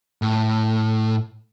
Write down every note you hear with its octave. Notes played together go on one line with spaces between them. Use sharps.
A2